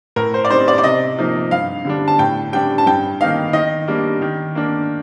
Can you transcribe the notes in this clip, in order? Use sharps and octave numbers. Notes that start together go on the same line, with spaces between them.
A2 A#4
C5
D5
G3 C4 D#4 C5
D5
D5
C3 D#5
F3 A#3 D#4
G2 F5
D3 G3 D4
A5
A2 G5
G3 D4 G5
A5
G2 G5
D#3 A#3 D#4 F5
D#3 D#5
G3 A#3 D4
D#3
A#3 D4